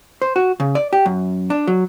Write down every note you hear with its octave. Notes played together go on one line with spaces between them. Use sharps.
C5
F#4
C#3
D5
G4
F#2
D4
F#3